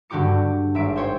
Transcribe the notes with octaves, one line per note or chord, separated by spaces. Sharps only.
G2 D3 F#4 G4 D6 C#7
G#1 E5 D7
C5 C#5 G5